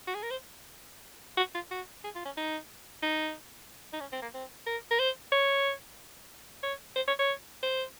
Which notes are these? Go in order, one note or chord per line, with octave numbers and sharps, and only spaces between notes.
F#4
G#4
A#4
C5
F#4
F4
F#4
G#4
F4
C#4
D#4
D#4
D#4
C#4
C4
A#3
C4
A#4
A#4
C5
C#5
C#5
C5
C#5
C#5
C5